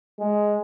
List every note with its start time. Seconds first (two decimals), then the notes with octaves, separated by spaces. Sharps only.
0.20 G#3